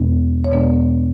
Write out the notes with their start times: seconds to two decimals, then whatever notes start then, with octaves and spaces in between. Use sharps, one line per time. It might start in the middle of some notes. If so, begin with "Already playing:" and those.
Already playing: E2 B2 G#3 B3 D4
0.44 C#5
0.52 E2 B2 G#3 B3 D4 D5